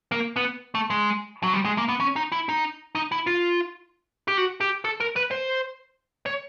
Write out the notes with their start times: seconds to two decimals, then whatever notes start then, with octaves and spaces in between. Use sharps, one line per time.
0.12 A#3
0.36 B3
0.75 A3
0.90 G#3
1.43 F#3
1.53 G3
1.65 G#3
1.78 A#3
1.88 B3
2.00 C#4
2.16 D#4
2.32 E4
2.49 D#4
2.95 D#4
3.12 E4
3.27 F4
4.28 G4
4.37 F#4
4.61 G4
4.85 A4
5.00 A#4
5.16 B4
5.31 C5
6.26 C#5